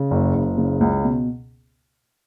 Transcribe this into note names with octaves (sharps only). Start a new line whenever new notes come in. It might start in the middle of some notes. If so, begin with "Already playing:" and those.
Already playing: C#3
F#1
F#1
C#3
C#2
B2